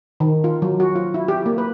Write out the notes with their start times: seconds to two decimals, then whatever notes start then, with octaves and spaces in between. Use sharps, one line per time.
0.20 D#3
0.44 F4
0.62 F#3
0.80 F#4
0.96 F4
1.14 E4
1.28 G4
1.46 A#3
1.58 B4